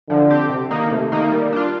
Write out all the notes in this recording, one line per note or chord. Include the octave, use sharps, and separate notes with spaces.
D3 F3
C4 G4
C3
D#3 A#3 D#4
C3 A3
D#3 A#3 D#4
G3 A#3
D4 F4